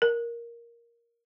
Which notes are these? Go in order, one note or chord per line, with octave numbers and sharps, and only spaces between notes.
A#4